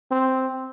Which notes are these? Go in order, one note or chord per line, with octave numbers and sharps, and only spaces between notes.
C4